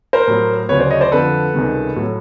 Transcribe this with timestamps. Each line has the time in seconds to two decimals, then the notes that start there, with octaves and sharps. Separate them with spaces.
0.13 A#4 C5
0.27 A2 F#3
0.69 D2 C#3 F#3 B4 C#5
0.79 C5 D5
0.90 C#5 D#5
1.01 C5 D5
1.12 F2 D3 F3 A4 B4
1.54 C#2 C3 D#3 G3
1.96 A2 F#3